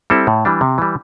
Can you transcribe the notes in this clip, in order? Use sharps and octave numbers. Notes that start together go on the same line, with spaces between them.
G3 C4 E4 A4
A2
E3 G3 D4
C3
E3 G3